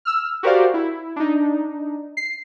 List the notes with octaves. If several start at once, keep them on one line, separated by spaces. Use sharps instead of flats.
E6 F6
F#4 G4 A#4 C5 D5 F5
E4
D4 D#4
C7